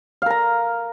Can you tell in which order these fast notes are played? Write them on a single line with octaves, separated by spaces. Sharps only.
F5 A#4 A#5